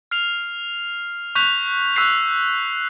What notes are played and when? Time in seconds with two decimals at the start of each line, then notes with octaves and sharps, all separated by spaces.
0.11 F6 C7 F7
1.35 C#6 F#6 G6 B6 F7
1.96 C#6 E6 F#6 B6 C7 F7